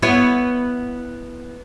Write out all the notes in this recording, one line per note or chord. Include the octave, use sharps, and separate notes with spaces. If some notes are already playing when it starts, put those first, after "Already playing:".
B3 E4 C#5